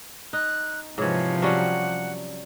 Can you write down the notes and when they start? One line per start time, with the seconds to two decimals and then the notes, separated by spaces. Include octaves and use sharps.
0.33 D#4 F#6
0.98 G#2 C3 E3 F3 C#5
1.42 F#3 G3 C#4 F#5